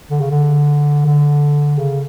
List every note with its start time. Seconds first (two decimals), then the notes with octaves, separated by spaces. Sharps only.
0.10 D3
0.20 C#3
0.31 D3
1.06 D3
1.78 C#3